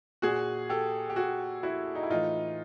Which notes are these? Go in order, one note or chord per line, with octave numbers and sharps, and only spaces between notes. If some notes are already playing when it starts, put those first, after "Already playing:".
A#2 F#4 G#4
G4 A4
G4
F#4 G#4
E4 F#4
D#4
E4
A2 E3 D#4 F4